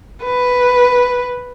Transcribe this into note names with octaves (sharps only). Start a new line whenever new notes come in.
B4